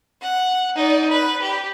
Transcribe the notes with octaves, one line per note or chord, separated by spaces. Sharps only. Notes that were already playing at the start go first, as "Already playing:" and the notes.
F#5
D#4 D5
B4
G4